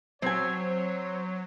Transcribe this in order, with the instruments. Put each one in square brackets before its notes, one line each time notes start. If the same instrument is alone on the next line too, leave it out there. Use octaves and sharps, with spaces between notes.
[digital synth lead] F#3 [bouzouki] C4 G#5 [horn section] C5 C#5